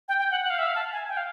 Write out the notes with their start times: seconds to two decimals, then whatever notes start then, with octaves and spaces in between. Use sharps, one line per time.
0.08 G5
0.19 G5
0.31 F#5
0.42 F#5
0.50 F5
0.59 E5
0.66 F5
0.75 A5
0.92 G#5
1.09 G5
1.17 F5